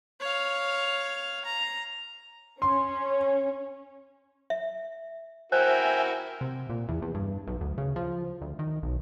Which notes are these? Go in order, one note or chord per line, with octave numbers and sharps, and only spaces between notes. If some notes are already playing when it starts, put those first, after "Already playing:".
C#5 F5
A#5
C#4 C#5 C6
E5
E4 F#4 A#4 C5 E5 G5 G#5
C3
A#2
E2
E2
G2
B1
D2
C#3
F3
D2
D#3
B1